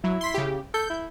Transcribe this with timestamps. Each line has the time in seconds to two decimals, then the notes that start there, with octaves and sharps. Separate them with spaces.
0.04 F#3 E4
0.21 C6 B6
0.34 C#3 G4
0.74 A4 G6
0.90 E4